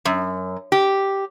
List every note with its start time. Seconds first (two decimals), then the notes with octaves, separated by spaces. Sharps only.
0.05 F#2
0.72 G4